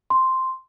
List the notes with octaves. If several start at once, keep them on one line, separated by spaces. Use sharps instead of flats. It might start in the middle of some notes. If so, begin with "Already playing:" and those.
C6